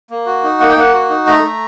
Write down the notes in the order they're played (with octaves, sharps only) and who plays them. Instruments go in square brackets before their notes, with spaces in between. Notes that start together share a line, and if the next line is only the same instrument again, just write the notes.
[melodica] A#3
F#4
D#4
A#3 F#5
G5
A#3 F#5
F#4
D#4
A3 A#5
A3